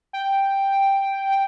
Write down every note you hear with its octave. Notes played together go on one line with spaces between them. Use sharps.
G5